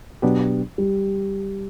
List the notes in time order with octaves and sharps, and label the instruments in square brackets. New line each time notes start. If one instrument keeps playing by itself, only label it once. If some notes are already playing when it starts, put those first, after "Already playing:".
[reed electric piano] B2 F#3 B3 D4 G4
[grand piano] G3